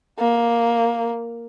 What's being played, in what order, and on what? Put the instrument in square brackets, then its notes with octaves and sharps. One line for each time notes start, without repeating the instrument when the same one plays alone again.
[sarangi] A#3